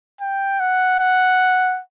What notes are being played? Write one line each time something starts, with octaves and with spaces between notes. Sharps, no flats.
G5
F#5
F#5